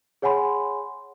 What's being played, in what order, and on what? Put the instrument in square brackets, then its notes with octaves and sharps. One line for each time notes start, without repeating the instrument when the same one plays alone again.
[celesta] G#4 C#5 F#5 G#5 B5 C6